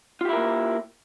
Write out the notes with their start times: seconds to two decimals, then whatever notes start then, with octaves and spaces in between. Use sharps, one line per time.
0.21 F4
0.25 G4
0.29 E4
0.33 A#4
0.37 A#3